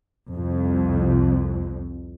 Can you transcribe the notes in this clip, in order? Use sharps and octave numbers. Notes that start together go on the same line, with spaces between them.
C2 F2